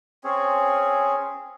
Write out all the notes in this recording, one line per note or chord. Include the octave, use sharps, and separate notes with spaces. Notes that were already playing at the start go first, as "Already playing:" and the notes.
C4 C#4 G#4 C#5